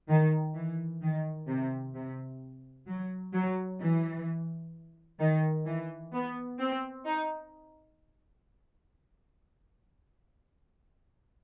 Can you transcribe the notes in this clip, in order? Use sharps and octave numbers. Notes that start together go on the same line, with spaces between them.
D#3
E3
D#3
C3
C3
F#3
F#3
E3
D#3
E3
B3
C4
D#4